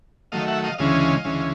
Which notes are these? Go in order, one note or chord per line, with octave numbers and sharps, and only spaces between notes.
D#3 F#3 A3 D#5 F5
E5 F#5
D#5 F5
D2 C#3 E3 G#3 C#4 D#5 F5
D2 C#3 E3 G#3 C#4